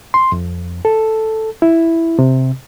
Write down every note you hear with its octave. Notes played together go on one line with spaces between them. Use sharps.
C6
F2
A4
E4
C3